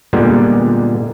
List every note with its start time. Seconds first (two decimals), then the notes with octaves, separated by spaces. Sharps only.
0.13 A#2 D3 G3 G#3 B3